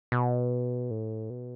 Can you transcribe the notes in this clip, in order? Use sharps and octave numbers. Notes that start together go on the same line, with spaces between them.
B2
A2
B2